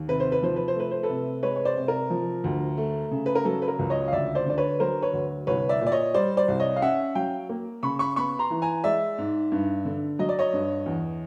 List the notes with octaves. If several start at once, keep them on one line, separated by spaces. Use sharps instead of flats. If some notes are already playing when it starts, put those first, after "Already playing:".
Already playing: D#2
C3 B4
C5
B4
F3 C5
B4
C5
A3 B4
C5
A4 B4
C3
G#3 B4 C#5
C#5
C5 D5
C3
A#4
F3
D2
A3
C#3
B4
A#4
F#3 A4
B4
A#4
C#2
C#5 D#5
F5
D2 D5 E5
C5 D5
D3 D5
B4 C#5
F#3 A#4 C5
B4 C#5
D2
C2 B4 C#5
D5 E5
A#2
D5
C#5 D#5
G3 C5 D5
C5 D5
C2
C#5 D#5
F5
C#4 E5 F#5
F#3 F5 G5
A#3
C#3 B5 C#6
B5 C#6
B3 B5 C#6
A#5 C6
E3
G#5 A#5
G#3 D5 E5
G#2
G2
D3
F#3 D#5
D5
C#5 D#5
G2
E2